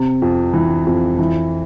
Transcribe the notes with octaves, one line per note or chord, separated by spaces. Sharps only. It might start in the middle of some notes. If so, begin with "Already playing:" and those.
Already playing: C3
F2
E3
F2
E3